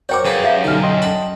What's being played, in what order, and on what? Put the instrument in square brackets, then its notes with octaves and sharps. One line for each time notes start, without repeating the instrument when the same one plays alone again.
[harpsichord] F#4 A#4 C5 [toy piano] C#5 G5 D6
[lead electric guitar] F#2 [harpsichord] F4 G#4 B4
[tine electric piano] G4 [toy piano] C#5 E5 F5
[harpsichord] B1 D3 [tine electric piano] D#4 F6
[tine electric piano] D#5 G5 C6
[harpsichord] F#5 A5 B5